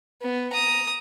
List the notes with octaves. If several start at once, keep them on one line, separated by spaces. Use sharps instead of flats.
B3
A#5 D#6